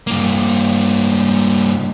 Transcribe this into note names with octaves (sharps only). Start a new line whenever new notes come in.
G2 A#3